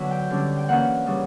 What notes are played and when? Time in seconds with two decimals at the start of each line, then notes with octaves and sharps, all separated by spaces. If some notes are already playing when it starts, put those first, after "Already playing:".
Already playing: D3 F#3 B3 E5
0.11 G5
0.30 D3 G3 C#4
0.57 G5
0.68 E3 A#3 C#4 F#5
1.06 C#3 E3 G3 C#4